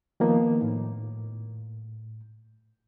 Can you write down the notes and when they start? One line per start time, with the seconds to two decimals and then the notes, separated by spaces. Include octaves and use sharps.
0.20 D#3 F3 A#3 B3 D#4
0.62 A2